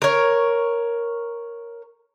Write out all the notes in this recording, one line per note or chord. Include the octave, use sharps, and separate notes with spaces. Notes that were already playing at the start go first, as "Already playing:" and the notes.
A#4 C#5